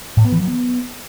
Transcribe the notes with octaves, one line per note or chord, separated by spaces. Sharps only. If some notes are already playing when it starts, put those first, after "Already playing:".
A2
B3
E3
F#3
B3